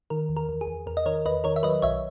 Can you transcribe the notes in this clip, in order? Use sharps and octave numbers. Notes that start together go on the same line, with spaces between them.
D#3 A#4
E2
A#4
E2
G#4
E2
E2 A#4
D#5
D#3 A#4 C#5
E2 B4 D#5
D#3 A#4 C#5
E5
F#3 B4 D#5
B1 C#5 E5